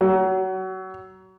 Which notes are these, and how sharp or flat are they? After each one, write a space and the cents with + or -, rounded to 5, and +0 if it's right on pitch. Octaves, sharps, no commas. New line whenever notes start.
F#3 +25